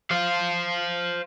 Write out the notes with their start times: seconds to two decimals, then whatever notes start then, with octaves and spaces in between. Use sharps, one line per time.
0.11 C5 F5